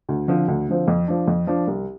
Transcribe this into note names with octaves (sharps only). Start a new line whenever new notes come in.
D2
D3 F3 C4
D2
D3 F3 C4
F2
F3 D4
F2
F3 D4
C2